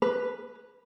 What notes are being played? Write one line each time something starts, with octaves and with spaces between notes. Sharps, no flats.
B4